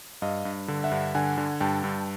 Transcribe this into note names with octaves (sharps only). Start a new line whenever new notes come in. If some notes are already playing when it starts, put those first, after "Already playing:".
G2 D#5 F5
G2
D3
E5 F#5
G2
D3 F#5 G#5
D3
G2 G5 A5
G2